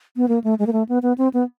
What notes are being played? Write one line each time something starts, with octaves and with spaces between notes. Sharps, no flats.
B3
A#3
A3
G#3
A#3
A3
B3
B3
C4
B3